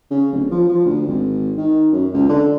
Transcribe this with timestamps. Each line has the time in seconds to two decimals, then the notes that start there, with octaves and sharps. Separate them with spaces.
0.11 C#3
0.32 D1
0.51 F3
0.69 F3
0.86 D2
1.07 G#1
1.57 D#3
1.92 F#2
2.13 C#2
2.29 D3